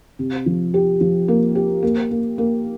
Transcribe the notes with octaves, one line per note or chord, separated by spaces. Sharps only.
C3
F3
G4
F3
A#3
G4
A#3
A#3
A#3